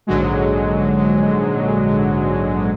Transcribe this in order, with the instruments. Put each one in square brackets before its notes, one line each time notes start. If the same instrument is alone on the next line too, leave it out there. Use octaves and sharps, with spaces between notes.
[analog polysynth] A#1 G#2 D3 F#3 G#3